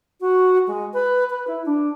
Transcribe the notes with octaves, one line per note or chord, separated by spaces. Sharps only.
F#4
G#3
B4
B4
E4
D4